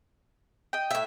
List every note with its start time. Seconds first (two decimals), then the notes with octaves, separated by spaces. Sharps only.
0.73 D#5 G5
0.91 A2 E5